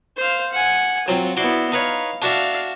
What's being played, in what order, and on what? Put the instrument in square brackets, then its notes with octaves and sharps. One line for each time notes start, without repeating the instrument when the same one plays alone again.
[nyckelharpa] C5 F5
F#5 G#5
[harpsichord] F#3 C4 [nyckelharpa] F4
[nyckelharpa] B3 E4 [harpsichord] F#4 D5 C6
[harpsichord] D#4 B4 C#5 [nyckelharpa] F5
[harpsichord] D4 F#4 E5 [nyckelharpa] D5 F5